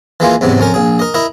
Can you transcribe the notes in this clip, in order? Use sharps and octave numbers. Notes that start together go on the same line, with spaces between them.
E3 G#3 A#3 F4
E2 G#2 C3 F#3
F2 C#4 A#4
A#1 G#4
A#4 D#5
E4 A#4 D#5